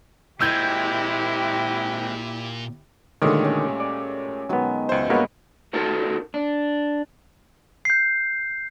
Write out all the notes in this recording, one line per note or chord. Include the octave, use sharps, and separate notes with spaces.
A#2 G#3 C4 E4 G4 E6 G6 G#6
A#2 D3 D#3 G#3 A3 G4 C#5 G5
C#4
D5
B2 D#3 F#3 G#3 B3
C#2 C5 E5
G2 G#3 A#3 B3 F#4 B4 C#5 D#5
A3 D#4 F#4 A4 A#4 A5
D4
G6 C7